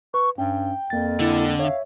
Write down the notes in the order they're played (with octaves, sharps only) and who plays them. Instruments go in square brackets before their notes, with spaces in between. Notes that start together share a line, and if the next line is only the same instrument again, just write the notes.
[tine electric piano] B4 [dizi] C#6
[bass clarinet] G2 [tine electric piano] C#4 [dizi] G5
[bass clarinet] F2 [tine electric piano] A#3 A6
[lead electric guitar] D3 [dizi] E4
[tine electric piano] C#5 E5 [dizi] F5